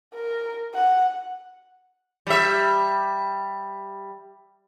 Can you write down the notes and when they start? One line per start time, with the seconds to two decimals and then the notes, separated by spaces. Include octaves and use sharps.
0.15 A#4
0.75 F#5
2.27 G3 E5